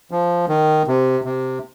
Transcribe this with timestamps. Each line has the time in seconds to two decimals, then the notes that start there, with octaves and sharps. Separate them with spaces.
0.11 F3
0.48 D#3
0.87 C3
1.24 C3